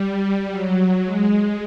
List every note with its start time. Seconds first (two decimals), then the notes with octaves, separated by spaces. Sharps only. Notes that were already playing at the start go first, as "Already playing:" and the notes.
Already playing: G3
0.50 F#3
1.04 G#3